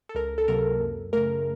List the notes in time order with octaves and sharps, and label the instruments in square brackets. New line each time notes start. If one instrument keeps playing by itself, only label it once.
[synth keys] A4
C#2 A#4
A4
C3 F#3 A#3 A#4
F#2
C#3 A3 A#4